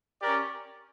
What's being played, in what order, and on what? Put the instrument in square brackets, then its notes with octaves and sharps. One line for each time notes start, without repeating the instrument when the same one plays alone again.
[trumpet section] C#4 G4 A#4 D5